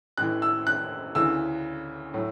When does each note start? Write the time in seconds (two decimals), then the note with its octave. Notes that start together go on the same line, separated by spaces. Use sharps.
0.17 A1 A2 E3 F#6
0.42 E6
0.67 F#6
1.15 D2 C#3 E3 E6
2.14 A2 F#3